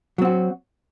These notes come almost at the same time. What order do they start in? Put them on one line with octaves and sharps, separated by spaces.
F#3 C4 F#4